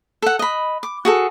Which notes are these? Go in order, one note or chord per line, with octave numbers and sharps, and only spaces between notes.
A4 F#5
D#5 B5
D6
F#4 G#4 A4